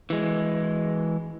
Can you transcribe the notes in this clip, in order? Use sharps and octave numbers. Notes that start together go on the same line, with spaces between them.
E3 G#3